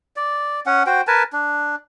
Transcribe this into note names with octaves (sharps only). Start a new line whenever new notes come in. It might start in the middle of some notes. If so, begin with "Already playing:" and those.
D5
C#4 F#5
F#4 C5 G5
A#4 B4 G#5 A5
D4